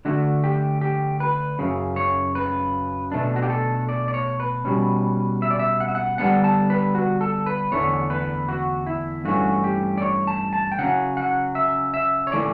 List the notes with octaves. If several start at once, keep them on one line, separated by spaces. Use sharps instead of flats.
D3 A3 D4 F#4
G4
G4
B4
F#2 C#3
C#5
B4
B2 A3 D4
F#4
G4
A4
D5
D5
C#5
B4
B2 G3 C#4
E5
D5
E5
F#5
E5
F#5
D3 G3 B3 D4 F#5
A5
B4
F#4
A4
B4
E2 D3 A3 C#5
B4
F#4
E4
G2 E3 A3 C#4 F#4
G4
D5
C#5
A5
A5
G5
C#3 F#3 C#4 F#5
F#5
E5
E5
C#5
E3 A3 D5